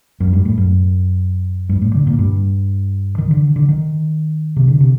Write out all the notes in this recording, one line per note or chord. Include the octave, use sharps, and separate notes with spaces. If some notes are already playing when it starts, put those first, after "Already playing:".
F#2
G2
A2
F#2
G2
A2
D3
A#2
G2
D#3
D3
D3
D#3
C3
D3
C3